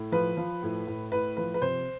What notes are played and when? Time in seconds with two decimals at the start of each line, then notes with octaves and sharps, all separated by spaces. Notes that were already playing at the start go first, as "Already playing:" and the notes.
Already playing: A2
0.12 F3 B4
0.37 F3
0.63 A2
0.87 A2
1.12 A2 B4
1.37 F3 B4
1.54 B4
1.62 C3 C5